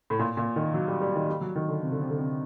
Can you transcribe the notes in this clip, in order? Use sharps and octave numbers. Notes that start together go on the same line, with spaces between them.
A2
A#2
A#2
D#3
F#3
G3
G3
D#3
G3
F#3
D#3
D3
C3
D3
C3
D3
C3